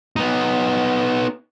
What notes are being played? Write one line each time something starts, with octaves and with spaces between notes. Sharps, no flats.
B3 D#4